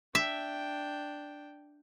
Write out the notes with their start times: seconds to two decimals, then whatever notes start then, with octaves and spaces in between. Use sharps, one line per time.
0.15 D4 E5 G5